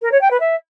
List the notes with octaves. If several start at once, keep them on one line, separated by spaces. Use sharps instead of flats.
A#4
C#5
G5
B4
E5